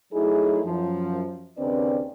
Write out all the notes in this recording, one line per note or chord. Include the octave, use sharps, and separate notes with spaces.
F#3 A3 D#4 E4 G#4
F#2 F3
D#2 C#3 C4 D4 B4 D5